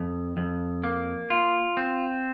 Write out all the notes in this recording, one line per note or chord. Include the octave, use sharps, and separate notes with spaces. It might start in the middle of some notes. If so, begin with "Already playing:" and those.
Already playing: F2
F2
A#3
F4
C4